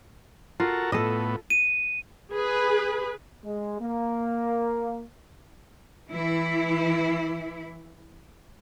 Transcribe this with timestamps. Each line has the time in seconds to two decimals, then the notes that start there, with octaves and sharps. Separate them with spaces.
0.60 F4 F#4 A4 A#4
0.92 A2 B3 A4 D#5
1.50 D#7
2.33 G#4 B4
3.44 G#3
3.81 A#3
6.10 E3 E4